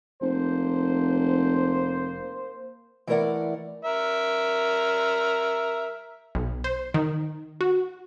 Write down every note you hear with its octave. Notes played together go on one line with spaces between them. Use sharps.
F1 A#3 C5
E3 A3 E4 A#4 D5 F#5
A#4 E5
B1
C5
D#3
F#4